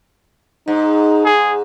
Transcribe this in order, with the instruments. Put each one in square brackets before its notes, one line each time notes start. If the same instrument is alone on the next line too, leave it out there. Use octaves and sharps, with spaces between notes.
[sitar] G#2 [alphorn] D#4
[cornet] G#4